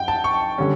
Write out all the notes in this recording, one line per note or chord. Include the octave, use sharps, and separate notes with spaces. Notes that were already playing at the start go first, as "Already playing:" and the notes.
Already playing: F#2 F#5 G5
A5
C#6
D3 G3 C#4